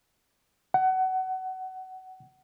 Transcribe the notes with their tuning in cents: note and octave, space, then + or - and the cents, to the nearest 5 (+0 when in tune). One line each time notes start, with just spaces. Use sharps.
F#5 +25